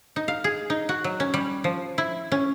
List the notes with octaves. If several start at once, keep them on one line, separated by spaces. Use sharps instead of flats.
D#4
F5
G#4
D#4
F#4
F#3
C#4
G3
F3
E4
C#4